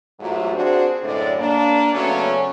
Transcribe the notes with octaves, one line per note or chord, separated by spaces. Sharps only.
E2 G#2 F#3 A3 F4 G4
C4 D4 F#4 G#4 C5
F#2 A2 D3 G#3 D5
A#3 D4
C#3 F#3 A3 B3 C#4